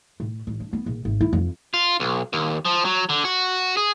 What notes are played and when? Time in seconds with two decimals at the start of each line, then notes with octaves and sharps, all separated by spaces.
0.20 A2
0.47 A1
0.60 D4
0.73 B3
0.86 A#1
1.05 G#1
1.21 E4
1.33 F2
1.74 F4
2.00 B1
2.33 D#2
2.65 F3
2.85 F#3
3.09 D3
3.25 F#4
3.77 G#4